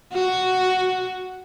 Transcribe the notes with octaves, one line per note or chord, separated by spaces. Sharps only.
F#4